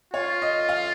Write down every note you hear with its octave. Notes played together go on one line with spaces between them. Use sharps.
F4 C#5
D#5
F5